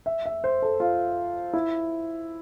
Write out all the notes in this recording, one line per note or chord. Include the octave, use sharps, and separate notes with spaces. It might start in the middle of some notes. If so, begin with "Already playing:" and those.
E5
E5
C5
A4
F4
E4